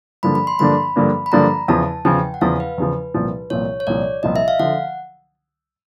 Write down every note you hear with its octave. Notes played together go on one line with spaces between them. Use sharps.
G2 D3 F3 A#3 D4 B5
B5
C6
G2 D3 F3 A#3 D4 B5
G2 D3 F3 A#3 D4
B5
G2 D3 F3 A#3 D4 A#5
E2 C#3 F3 A5
E2 C#3 F3 G5
F#5
E2 C#3 F3 F5
B4
E2 C#3 F3
C2 A#2 F3
C2 A#2 F3 C#5
C#5
C2 A#2 F3 D5
C2 A#2 F3 D#5
E5
F5
D3 F3 F#5